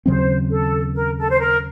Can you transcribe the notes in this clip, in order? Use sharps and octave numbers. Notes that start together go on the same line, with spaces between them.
D#2 C#3 F#3 C4 C5
A4
A#4
A4
C5
A#4